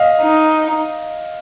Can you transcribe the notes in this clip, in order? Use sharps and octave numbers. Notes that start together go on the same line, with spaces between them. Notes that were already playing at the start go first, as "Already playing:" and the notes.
Already playing: D#5 F5
D#4